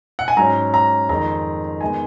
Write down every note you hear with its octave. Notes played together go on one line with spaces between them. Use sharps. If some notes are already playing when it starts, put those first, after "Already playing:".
F#5
G#5
G#2 F#3 C#4 A#5
A#5
F2 D#3 G#3 A#5
D#3 G#3 B3 D#4 G#5